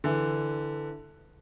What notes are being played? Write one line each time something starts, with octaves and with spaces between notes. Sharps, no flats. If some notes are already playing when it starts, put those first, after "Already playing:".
D3 E3